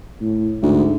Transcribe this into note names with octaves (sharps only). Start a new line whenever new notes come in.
A2
D2 G#2